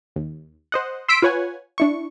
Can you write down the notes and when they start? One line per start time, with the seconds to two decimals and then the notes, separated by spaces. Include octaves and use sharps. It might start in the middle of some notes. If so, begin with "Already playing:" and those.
0.16 D#2
0.72 C5 D#5 F#5
1.08 C6 E6 B6 D7
1.22 F4 B4 C#5 F#5 G#5
1.78 D4 E4 C#6